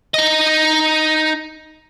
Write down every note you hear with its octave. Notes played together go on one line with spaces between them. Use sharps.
D#4 D#5